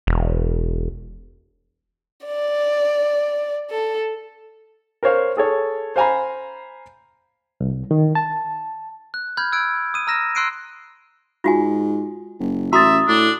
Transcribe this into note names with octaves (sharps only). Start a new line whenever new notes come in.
E1
D5
A4
A#4 C5 C#5 F5
G#4 A4 C#5
C5 F5 G#5 A#5 B5
C2
D#3
A5
F#6
B5 F6 G6 G#6
E6 F#6 G#6 D7
D#6 D#7
A#5 E6 F6 A#6 E7
C6 E6 F#6 C7 D7 D#7
G#2 F4 F#4 G#5
F#1
A1 F#4 E5 A#5 C6 D#6 A6
A2 D4